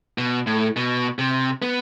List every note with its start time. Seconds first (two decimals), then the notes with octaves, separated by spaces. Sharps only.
0.18 B2
0.47 A2
0.76 B2
1.19 C3
1.62 B3